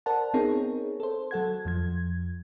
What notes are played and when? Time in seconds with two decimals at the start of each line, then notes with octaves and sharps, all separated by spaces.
0.06 A#4 C5 D5 F#5 A5
0.34 B3 C4 D#4 G#4 A#4 C#5
1.00 A4 C5
1.31 F#3 A4 F#5 G#6
1.65 F2 F3 G#6